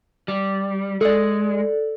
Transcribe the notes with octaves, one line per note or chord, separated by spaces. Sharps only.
G3
G#3 A4 D5